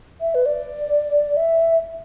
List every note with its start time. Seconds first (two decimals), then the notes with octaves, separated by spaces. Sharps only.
0.21 E5
0.35 B4
0.46 D5
1.37 E5